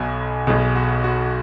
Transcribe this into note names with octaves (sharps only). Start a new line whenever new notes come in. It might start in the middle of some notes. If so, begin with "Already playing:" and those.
Already playing: B1 B2 G#5
B1 B2 G#4
F#4
F#4